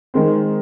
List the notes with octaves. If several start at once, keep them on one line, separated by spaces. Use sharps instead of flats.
D#3 G#3 C4